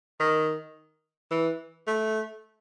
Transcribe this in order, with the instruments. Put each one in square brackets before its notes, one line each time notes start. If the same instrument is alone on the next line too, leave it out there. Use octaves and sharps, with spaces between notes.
[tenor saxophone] D#3
E3
A3